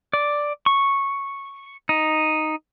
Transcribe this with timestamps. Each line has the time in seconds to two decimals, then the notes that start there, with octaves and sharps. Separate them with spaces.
0.13 D5
0.66 C#6
1.89 D#4